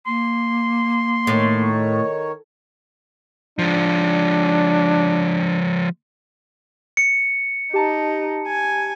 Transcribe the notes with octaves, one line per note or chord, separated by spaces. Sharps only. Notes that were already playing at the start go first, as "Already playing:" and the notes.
A#3 C6
A2 D#3 C#5
F3 G#3 D4
C#7
D#4 G4 A5 A#5
G#5